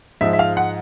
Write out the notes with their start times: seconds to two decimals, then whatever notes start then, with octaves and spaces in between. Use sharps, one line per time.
0.21 G#2 F3 G#3 E5
0.33 E5
0.39 F5
0.57 F#5